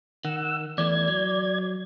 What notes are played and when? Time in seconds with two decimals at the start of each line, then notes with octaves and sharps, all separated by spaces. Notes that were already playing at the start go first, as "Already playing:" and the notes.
0.25 D#3 F#5 E6
0.78 E2 E3 A3 D5 G#6
1.08 F#3